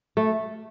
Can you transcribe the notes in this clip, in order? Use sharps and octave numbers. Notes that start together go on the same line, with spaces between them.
A3